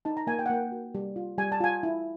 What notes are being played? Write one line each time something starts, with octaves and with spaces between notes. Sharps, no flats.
D#4 A5
A#5
A#3 G#5
G5
F#5
A#3 G5
F#4
G3
F4
G3 G#5
A5
F4 G#5
E4